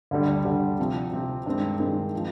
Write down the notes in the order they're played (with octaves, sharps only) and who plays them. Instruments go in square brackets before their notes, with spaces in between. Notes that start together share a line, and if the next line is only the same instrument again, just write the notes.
[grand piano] D2 D3 G3
D2 D3 G3
C3 F3 C4
C3 F3 C4
G2 D#3 G#3 C4
G2 D#3 G#3 C4
F3